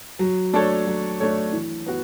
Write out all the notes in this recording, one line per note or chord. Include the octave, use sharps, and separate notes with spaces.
F#3
A3 D4 A4 C#5
F#3
A3 D4 A4 C#5
E3
B3 F#4